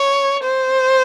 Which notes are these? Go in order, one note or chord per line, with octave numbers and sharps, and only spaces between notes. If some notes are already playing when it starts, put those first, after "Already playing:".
Already playing: C#5
C5